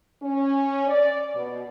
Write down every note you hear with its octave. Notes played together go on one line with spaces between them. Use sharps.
C#4
D5
B2